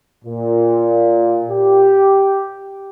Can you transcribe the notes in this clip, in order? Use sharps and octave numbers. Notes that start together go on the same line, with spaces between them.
A#2
G4